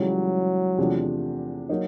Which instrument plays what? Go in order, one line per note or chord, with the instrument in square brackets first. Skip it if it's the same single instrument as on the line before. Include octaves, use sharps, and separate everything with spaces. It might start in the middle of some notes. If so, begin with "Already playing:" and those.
Already playing: [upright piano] C#2 C#3 E3 G3 [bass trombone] F#3
[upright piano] E2 C3 F3 A3 D4
F#3 A#3 D#4